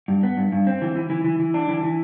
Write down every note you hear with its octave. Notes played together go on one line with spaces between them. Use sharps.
G2
B3
G2
G2
C4
E3
E3
E3
E3
E3
D4
E3
E3